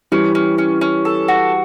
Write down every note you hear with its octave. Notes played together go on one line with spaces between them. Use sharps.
E3 G3 C#4
C#4
C#4
C#4
A4
F#4